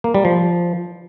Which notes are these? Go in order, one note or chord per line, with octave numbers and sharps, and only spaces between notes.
A#3
G3
F3